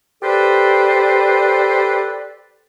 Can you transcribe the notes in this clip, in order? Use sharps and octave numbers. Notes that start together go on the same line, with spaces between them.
G4 A4 B4 C5 D5